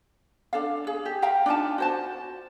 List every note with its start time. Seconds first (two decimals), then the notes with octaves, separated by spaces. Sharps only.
0.53 D4 A4 F5
0.87 G#4
1.06 G4
1.22 E5 F5 G5 A#5
1.46 D4 D#4 F4 A5
1.78 F#4 C5 A5